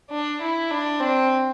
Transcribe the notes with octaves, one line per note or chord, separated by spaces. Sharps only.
D4
E4
D4
C4